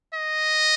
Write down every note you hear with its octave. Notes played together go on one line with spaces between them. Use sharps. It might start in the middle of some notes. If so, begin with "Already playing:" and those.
D#5